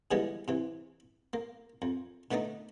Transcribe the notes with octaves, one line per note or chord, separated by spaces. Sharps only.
D3 E3 F3 G3 G#3 B3
C3 E3
A#3
F2
D3 A3 B3 D4 D#4